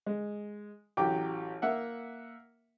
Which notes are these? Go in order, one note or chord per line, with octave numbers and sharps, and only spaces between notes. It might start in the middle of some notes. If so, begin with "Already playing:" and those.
G#3
A1 F#3 G4 G5 D6
A#3 E5 F#5